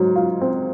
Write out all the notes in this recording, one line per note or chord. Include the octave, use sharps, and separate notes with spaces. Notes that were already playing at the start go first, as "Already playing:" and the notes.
Already playing: G#2 F#3
F4
C4